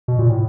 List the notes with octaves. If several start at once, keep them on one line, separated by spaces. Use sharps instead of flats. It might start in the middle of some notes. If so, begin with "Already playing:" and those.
B2
A#2
A2